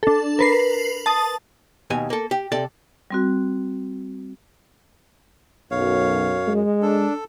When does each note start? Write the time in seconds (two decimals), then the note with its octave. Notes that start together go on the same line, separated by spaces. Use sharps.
0.03 D4 A4
0.39 A#4 B4 C7
1.06 A5 D#6
1.90 D#2 B2 G#5
2.10 A#3 A4
2.31 G4
2.52 C3 A4 D5 A5
3.10 G3 C4 F#4
5.71 B1 F#2 C#5 F5
6.48 G#3
6.82 D4 A4